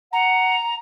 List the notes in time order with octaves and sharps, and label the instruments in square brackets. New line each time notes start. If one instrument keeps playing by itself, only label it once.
[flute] F#5 [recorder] A#5